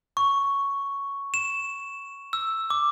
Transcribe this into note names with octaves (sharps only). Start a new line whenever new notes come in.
C#6
E7
E6
D6